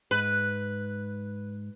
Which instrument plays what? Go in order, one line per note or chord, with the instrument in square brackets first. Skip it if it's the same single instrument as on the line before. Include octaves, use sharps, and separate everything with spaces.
[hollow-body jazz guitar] G#2 [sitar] B4